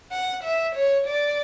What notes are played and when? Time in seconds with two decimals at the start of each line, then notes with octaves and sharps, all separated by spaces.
0.12 F#5
0.44 E5
0.75 C#5
1.07 D5